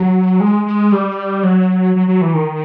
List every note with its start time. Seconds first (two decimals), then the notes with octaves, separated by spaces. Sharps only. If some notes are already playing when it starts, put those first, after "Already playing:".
Already playing: F#3
0.40 G#3
0.65 G#3
0.92 G3
1.43 F#3
1.96 F#3
2.08 F#3
2.21 E3
2.34 D#3